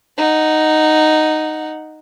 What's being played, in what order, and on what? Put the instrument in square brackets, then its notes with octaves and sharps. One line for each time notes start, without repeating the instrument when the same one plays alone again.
[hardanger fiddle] D#4 F#5